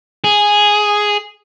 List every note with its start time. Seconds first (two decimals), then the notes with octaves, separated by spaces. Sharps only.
0.24 G#4